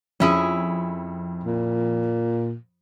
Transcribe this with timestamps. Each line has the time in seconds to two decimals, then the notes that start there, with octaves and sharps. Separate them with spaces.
0.20 F2 C#4 E4 G#4
1.44 A#2